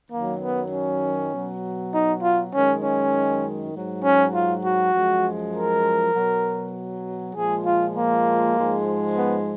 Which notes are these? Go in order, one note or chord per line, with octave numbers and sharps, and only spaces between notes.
F#2 D#3 F#3 A#3
B3
C#4
B2 F#3
D#4
F4
F#2 D#3 G#3 C#4
C#4
G#2 F#3
C#4
F4
F#4
F#2 F3 G#3
A#4
B2 F#3
A#2 F3 G#3 G#4
F4
A#3
G#2 F3 G#3
B3